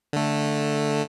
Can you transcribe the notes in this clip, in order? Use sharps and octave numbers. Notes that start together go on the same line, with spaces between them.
D3 A3